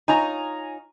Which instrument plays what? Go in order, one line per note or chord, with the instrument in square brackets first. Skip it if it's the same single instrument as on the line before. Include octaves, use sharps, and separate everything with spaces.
[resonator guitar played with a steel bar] D#4 F4 C#5 [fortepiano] G#5 A#5